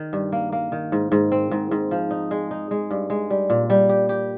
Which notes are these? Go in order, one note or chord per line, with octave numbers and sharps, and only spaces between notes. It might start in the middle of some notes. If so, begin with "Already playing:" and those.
Already playing: D#3
G2
A#3
A#3
D#3
G#2
G#2
C4
G#2
G#2
F3
D#4
G#3
D#4
G#3
G2
G#3
G3
A#2
G3
G4
G4